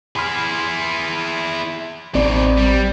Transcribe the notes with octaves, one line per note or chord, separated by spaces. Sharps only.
E4 G#4 B5 C6 F6
A1 B2 D#3 C4 D5
G3